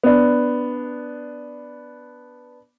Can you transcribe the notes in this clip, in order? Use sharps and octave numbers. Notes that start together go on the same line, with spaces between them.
B3 D4